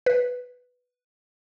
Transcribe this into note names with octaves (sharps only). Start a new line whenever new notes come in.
B4